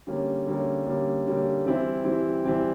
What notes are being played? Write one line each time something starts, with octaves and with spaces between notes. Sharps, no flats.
D3 G3 A#3 C#4
D3 G3 A#3 C#4
D3 G3 A#3 C#4
D3 G3 A#3 C#4
E3 G3 C4 E4
E3 G3 C4 E4
E3 G3 C4 E4